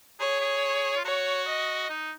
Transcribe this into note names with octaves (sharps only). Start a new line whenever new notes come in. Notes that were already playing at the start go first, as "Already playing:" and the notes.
G#4 C#5
G#4
F4
F#4 C#5
D#5
D#4